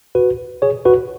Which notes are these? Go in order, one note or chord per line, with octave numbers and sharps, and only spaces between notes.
F#4 B4
G#4 C#5
F#4 B4